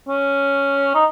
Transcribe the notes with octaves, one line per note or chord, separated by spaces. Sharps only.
C#4
D#4